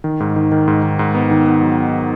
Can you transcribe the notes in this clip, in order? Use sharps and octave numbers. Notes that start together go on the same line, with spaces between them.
D#3
G#2
D#3
D#3
G#2
D#3
G#2
B3
D#3
B3
F#3